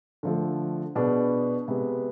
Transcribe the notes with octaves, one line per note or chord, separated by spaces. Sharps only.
D3 F3 A3
B2 B3 D4 G#4
C3 G#3 B3